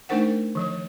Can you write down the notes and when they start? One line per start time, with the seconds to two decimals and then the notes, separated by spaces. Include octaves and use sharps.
0.09 A3 D4 D#4 A#4 C5 F#5
0.55 D#3 F3 C#5